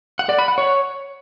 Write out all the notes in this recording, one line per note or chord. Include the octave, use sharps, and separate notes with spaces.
F#5
D5
B5
F#5
C#5